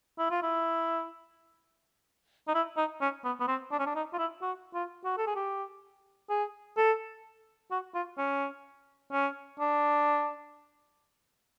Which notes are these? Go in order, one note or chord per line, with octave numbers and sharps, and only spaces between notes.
E4
F4
E4
D#4
E4
D#4
C#4
B3
B3
C4
D4
C#4
D4
D#4
F4
E4
F#4
F4
F#4
A4
G#4
G4
G#4
A4
F#4
F4
C#4
C#4
D4